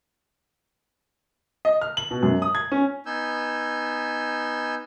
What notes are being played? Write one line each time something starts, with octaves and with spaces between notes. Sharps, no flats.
D#5
F6
F#7
B2
F#2
D#6
G#6
C#4
B3 D#4 G#5 E6 G6